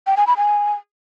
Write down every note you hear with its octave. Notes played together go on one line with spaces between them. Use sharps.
G5
G#5
B5
G#5